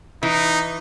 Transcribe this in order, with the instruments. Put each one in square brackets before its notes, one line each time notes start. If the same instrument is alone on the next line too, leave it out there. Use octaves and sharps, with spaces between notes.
[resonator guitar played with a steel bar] E3 [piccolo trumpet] D#4